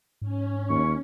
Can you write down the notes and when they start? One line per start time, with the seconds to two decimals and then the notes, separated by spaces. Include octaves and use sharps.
0.22 G#2 C#4
0.70 D#2 C#6